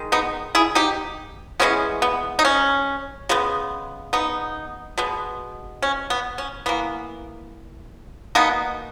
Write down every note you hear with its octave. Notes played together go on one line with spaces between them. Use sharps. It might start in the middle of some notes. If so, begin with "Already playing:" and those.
Already playing: D#3 G#3
B3 D#4
E4 G#4
D#4 G4
E3 G#3 B3 C#4
B3
D#4
C#4
C#3 G#3 B3
B3 D#4
B2 G#3 B3
C#4
B3
C#4
E3 A#3 B3
B2 A#3 B3 D#4